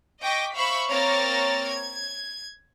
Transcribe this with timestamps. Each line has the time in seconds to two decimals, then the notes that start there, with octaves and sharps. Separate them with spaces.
0.22 D#5 G5 C#6 D6 A#6 B6
0.55 C5 E5 F5 B5 C#6
0.90 A#3 C4 C#5 A#5 F6 A6
1.70 G#6